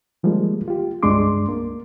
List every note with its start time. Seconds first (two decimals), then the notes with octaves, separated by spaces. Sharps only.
0.23 D#3 F3 G3 G#3 A#3
0.68 F4 G4
1.03 C#2 G2 G#3 D4 C6 D6
1.49 A#3